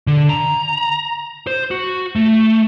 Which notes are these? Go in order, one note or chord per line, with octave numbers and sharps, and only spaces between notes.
D3
A#5
C5
F#4
A3